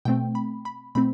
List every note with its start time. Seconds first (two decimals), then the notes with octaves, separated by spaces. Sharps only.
0.05 B2 A3 C4 G5
0.35 B5
0.65 B5
0.95 B2 A3 C4 B5